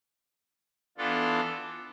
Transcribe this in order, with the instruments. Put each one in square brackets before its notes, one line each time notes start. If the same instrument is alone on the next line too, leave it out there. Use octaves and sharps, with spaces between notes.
[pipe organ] E3 B3 D4 F4 A4